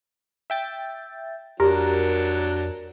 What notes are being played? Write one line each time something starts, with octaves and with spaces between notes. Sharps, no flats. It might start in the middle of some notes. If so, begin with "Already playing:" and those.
E5 G5 A6
F2 F#3 D4 G4 A#4